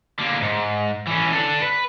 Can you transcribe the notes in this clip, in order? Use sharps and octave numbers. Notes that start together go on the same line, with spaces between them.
D3 A#3
G#2
E3 C#4
D4 A4
B4